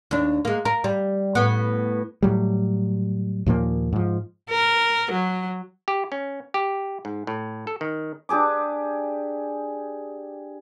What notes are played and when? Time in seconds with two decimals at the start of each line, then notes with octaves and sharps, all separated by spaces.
0.11 D#2 D4
0.45 G#3 A#3
0.65 A#4
0.84 G3
1.35 A2 B3
2.22 A2 F#3 G3
3.46 D#2 A#2 F3 A#3
3.93 G#2 F3
4.50 A#4
5.12 F#3
5.88 G4
6.12 C#4
6.54 G4
7.05 G#2
7.27 A2
7.67 A4
7.81 D#3
8.29 D4 G4 G#4 D6